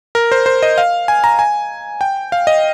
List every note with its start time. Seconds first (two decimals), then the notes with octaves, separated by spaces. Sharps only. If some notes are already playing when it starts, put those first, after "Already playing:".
0.15 A#4
0.32 C5
0.46 C5
0.63 D#5
0.78 F5
1.08 G#5
1.24 A#5
1.39 G#5
2.01 G5
2.32 F5
2.47 D#5